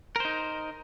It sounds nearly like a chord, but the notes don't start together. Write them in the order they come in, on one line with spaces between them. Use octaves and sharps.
A#4 C5 D#4